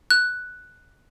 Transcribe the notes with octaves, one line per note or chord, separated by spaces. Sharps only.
F#6